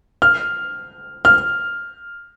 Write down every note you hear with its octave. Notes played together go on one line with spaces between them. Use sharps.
F6
F6